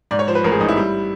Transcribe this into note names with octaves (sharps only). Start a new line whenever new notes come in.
G#2 D5
C#5
F3 C5
B4
A1 A#4
G#4
A1 D#4
E4
G3